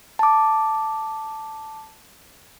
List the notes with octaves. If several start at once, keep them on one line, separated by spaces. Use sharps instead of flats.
A5 D6